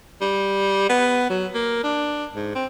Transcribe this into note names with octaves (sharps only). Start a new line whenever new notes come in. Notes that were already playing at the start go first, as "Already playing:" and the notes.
G3
B3
F#3
A#3
D4
G#2
C4